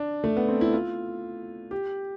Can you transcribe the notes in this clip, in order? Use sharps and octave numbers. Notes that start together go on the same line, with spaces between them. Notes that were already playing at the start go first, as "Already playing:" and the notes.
Already playing: D4
A3
B3
C4
E4
F4
G4